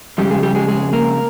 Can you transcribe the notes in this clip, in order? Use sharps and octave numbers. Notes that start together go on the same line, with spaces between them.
F2 C#3 G3 G#3 G4
G#3 G#4
G3 G4
G#3 G#4
G#3 G#4
A#3 A#4